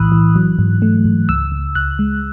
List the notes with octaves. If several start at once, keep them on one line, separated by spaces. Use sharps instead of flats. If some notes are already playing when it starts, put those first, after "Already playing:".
Already playing: B1 A2 E3 B5 D#6 E6 F#6
E3
F#3
G#2
A3
G#2
C#2 E6
C#2
C#2 F#6
G#3